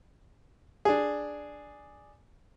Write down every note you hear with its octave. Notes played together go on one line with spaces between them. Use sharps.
D4 G#4